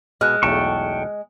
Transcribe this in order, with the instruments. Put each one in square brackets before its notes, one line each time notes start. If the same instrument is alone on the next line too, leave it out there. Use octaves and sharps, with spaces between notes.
[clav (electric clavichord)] B2 [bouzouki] G#3 [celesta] F6 F#6
[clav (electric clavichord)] B1 E2 A3 [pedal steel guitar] G5 A5 C#6